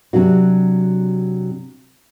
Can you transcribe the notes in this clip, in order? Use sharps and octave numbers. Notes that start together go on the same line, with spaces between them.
C3 F#3 D4 F#4